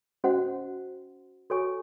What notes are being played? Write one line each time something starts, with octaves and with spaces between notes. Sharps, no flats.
C#4 F#4 C5 D#5 F#5
F#4 A4 C#5 G#5 C#6